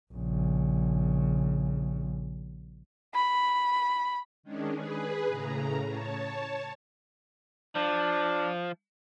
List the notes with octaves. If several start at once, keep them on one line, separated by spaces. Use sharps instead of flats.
A#1 C#3
B5
D#3 G#3 C#4 D4
G#4 B4
A2 C#3 A#5
C#5 A5
F3 D4